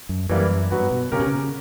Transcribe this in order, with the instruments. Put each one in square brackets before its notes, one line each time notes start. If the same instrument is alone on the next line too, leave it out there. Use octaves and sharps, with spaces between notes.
[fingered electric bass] F#2
[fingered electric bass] F#2 [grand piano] E3 G3 A#3 E4
[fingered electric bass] G2 [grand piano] F#3 B3 F#4 B4
[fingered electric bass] B2
[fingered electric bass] C#3 [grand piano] A#3 C#4 G4 A#4
[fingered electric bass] B2
C#3